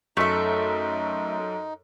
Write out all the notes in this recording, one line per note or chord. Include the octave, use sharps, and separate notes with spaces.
F#2 A3 D#4 A4 E5